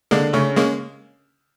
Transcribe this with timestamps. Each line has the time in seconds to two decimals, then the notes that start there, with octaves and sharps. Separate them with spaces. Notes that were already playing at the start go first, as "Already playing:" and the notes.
0.11 D3 G#3 A#3 D4
0.33 C#3 A3 C#4
0.57 G#3 A#3 C#4